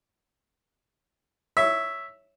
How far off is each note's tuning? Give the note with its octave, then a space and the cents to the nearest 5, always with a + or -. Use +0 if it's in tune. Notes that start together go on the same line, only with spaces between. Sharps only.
C#5 +0 E5 +0 E6 -40